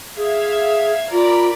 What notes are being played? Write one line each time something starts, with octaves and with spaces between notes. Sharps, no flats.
G#4 E5 F5 G#6
F4 A#4 D5 B5